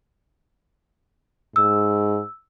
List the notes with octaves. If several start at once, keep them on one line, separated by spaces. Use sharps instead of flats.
G#2 E6